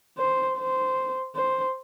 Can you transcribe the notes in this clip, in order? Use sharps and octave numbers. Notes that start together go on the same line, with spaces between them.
C5
C5
C5